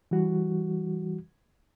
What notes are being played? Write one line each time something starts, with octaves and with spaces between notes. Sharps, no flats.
E3 G3 F#4